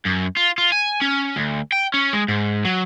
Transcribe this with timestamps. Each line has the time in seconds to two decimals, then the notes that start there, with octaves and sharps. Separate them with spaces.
0.05 F#2
0.36 F4
0.58 F4
0.72 G#5
1.02 C#4
1.37 D2
1.72 G5
1.94 C#4
2.13 G#3
2.28 G#2
2.65 F#3